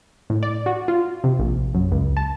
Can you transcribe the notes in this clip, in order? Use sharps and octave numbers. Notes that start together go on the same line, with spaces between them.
A2
D5
F#4
F4
C3
A#1
F#2
C#2
A5